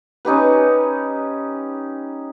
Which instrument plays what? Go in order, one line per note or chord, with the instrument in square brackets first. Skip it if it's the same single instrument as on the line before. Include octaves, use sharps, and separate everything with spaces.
[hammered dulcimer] C#4 D#4 G4 B4